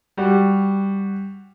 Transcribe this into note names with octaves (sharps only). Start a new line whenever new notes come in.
G3 F#4